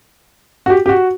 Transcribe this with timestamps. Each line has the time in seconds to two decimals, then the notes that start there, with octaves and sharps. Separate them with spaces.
0.66 F#4
0.70 G4
0.86 G4
0.89 F#4